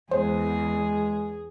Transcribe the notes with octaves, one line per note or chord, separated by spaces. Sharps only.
E2 G#3 G#4 C5